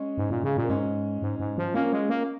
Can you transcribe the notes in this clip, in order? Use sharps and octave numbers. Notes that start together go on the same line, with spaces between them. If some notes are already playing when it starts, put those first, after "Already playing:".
Already playing: G#3 C#4
G#2
A#2
C#3
A#2
A#3
G#2 G#3 C#4
G#2
G#2
F3
A#3 C#4 F4
G#3
A#3